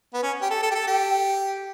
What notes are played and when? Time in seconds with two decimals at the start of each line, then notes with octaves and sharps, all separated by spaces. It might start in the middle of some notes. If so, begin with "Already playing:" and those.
0.14 B3
0.23 C#4
0.42 G4
0.51 A4
0.63 A4
0.71 G4
0.75 A4
0.87 G4